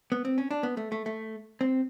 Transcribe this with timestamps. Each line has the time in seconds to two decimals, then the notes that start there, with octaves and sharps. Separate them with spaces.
0.12 B3
0.25 C4
0.38 C#4
0.51 D4
0.63 B3
0.77 A3
0.92 A3
1.06 A3
1.61 C4